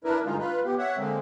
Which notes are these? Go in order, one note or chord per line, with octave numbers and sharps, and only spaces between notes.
D4 E4 A#4 B4
G2 D3 G#3 D#4 F4
F4 B4
B3 G4
C#5 E5 F#5
D3 G#3 A#3 C4